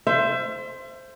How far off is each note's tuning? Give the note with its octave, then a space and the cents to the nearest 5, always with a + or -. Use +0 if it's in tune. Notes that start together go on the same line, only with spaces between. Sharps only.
C5 +0 E5 +35